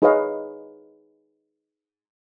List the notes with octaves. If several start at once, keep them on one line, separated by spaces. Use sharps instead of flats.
D#4 G#4 B4 C#5 D#5 F5